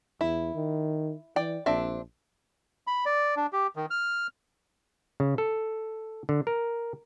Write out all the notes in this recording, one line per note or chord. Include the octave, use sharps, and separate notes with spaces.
E2 E4
D#3
E3 D5 G5
A#1 C4 D4 E5
B5
D5
D4
G4
D#3
F6
C#3
A4
D3
A#4